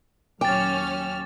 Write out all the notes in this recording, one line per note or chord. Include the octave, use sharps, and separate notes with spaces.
D#2 A#2 F#3 C#4 G5 D6 F6 A6